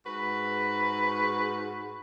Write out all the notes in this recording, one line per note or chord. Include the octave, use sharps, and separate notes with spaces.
G#2 F#4 B4